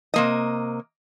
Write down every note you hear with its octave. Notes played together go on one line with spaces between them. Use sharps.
C3 A#3 D#5